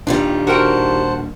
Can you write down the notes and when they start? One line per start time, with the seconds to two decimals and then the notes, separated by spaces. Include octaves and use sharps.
0.07 D#1 D#3 G3 D4 F4
0.47 F#4 A#4 C5 F#5 G5 A5